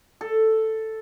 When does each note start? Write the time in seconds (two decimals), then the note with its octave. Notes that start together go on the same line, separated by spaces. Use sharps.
0.21 A4